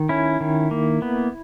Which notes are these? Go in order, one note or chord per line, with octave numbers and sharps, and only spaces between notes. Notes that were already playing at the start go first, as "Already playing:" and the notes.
Already playing: D#3
C#4 E4
D#3
A#3
B3